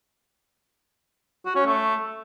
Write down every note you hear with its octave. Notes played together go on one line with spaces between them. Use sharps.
F#4
C#4
A3